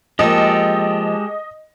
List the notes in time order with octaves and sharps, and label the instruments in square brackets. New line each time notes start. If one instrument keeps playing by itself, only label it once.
[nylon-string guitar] F3 A#3 [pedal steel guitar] G#3 G4 A4 [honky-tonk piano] D#5